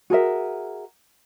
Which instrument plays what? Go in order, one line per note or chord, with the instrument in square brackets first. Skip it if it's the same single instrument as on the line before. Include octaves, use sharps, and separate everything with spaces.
[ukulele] F#4 G#4 A#4 E5